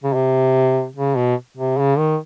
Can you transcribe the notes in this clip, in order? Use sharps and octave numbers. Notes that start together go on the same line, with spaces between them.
C#3
C3
C#3
B2
C3
C#3
D#3